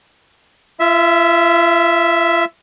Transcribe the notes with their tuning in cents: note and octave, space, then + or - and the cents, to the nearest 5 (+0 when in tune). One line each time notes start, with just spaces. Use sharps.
F4 -40 E5 +0